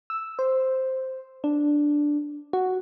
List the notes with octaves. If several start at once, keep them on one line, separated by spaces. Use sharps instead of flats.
E6
C5
D4
F#4